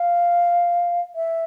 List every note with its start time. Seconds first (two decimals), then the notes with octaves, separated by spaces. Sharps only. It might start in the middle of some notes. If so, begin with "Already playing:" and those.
Already playing: F5
1.15 E5